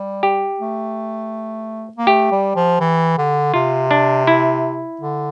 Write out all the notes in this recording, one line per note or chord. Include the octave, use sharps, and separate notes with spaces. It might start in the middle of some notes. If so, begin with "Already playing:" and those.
Already playing: G3
G4
A3
A#3
A3 G4
G3
F3
E3
D3
C3 F4
D4
E4
D3